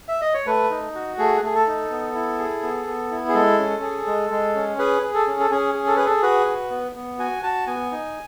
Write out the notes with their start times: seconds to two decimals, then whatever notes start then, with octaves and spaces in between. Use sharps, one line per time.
0.08 E5
0.21 D#5
0.34 C#5
0.46 A3 B4
0.71 D#4
0.95 F#4
1.18 A3 G#4
1.43 A3 G#4
1.55 A4
1.67 D#4
1.90 B3
2.15 E4
2.39 G#4
2.63 B3
2.87 B3
3.11 E4
3.29 G#4
3.34 G#3 A4
3.59 C#4
3.82 G#4
4.07 G#3
4.31 G#3
4.55 C#4
4.79 G#4 B4
5.03 G#4
5.14 A4
5.27 C#4
5.40 A4
5.51 C#4 G#4
5.75 G#4
5.87 A4
5.96 G#4 B4
6.06 A4
6.23 F#4 B4
6.47 F#4
6.70 B3
6.95 B3
7.19 F#4 G#5
7.43 F#4 A5
7.67 B3 G#5
7.91 D#4